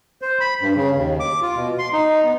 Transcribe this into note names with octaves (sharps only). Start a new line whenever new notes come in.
C5
B5
G2
C#3
D#2
D6
F4
B2
C6
D#4
B3